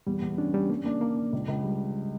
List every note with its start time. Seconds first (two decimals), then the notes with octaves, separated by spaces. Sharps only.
0.07 E2 G3
0.22 E2
0.38 C#4 D4
0.54 G3 C#4
0.70 A#3 D4
0.85 A#3 D4
1.01 A#3 D4
1.17 D4
1.33 C#2
1.48 C#2
1.64 G3